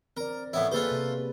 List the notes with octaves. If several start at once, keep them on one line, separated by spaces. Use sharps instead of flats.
C4 A#4 D5
A2 B3 E4 C#5
A#3 F4 G#4 A4 B4 C5
C3